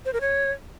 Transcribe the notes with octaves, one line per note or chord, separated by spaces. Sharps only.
C5
A#4
C#5